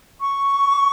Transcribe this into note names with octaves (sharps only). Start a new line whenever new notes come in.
C#6